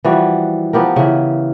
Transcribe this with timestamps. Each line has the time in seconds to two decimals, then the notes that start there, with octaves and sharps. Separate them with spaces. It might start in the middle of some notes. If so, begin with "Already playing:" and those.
0.04 E3 F3 G3 F#4
0.73 F3 B3 G4 A#4
0.96 C#3 E3